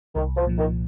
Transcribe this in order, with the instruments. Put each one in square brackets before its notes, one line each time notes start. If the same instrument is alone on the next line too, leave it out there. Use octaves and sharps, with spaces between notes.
[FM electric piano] C2 [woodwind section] D#3
[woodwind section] F3
[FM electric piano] A#2 F3
[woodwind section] D#3